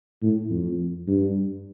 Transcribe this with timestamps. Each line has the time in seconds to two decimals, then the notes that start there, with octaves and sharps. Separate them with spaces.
0.22 A2
0.51 F2
1.08 G2